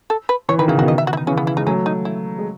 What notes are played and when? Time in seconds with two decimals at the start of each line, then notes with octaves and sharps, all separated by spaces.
0.10 A4
0.29 B4
0.49 E3 C#5
0.58 D#3 B4
0.68 C#3 E4
0.77 B2 D#3 F#4
0.88 D#5
0.98 E5
1.07 F#4
1.13 E4
1.17 D#4
1.27 C#3 E3 C#4
1.37 B3
1.47 E4
1.57 G#3 D#4
1.66 F#3 A3 C#4
1.86 D#4
2.05 E4
2.39 G#3